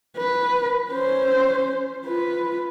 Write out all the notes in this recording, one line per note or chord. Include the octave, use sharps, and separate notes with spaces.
B4
C#4 C5
F4 B4